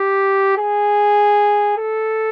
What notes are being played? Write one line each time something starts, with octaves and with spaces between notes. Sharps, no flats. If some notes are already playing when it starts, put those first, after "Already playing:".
Already playing: G4
G#4
A4